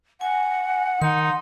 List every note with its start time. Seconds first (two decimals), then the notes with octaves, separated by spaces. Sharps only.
0.21 F#5 G#5
1.02 D#3 D#4 C6